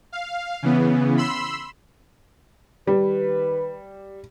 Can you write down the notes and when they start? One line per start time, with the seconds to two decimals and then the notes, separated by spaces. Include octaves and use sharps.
0.12 F5
0.63 C#3 E3 B3
1.17 B5 C6 E6
2.87 D#3 G3 B4